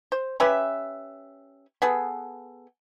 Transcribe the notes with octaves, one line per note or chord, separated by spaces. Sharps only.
C5
C#4 G4 B4 E5
B3 G#4 A4